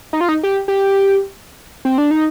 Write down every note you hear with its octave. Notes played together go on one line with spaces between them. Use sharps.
D#4
F4
D#4
G4
G4
C4
D4
D#4